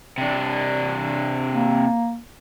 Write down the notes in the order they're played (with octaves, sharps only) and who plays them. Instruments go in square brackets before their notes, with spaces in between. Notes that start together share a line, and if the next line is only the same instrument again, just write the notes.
[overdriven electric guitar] C3 D4
[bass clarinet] A#3